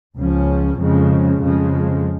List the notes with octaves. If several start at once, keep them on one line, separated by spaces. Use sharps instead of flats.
C#2 C#3 F3 C#4
F2 C#3 F3 G#3
F2 C#3 F3 G#3